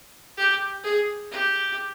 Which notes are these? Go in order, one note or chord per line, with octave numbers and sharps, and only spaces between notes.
G4
G#4
G4